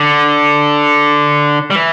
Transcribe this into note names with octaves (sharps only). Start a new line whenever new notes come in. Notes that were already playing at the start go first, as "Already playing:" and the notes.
Already playing: D3
G3
E3